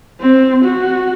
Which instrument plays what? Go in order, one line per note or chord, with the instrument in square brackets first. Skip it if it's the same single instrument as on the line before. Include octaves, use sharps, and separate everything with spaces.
[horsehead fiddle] C4
F#4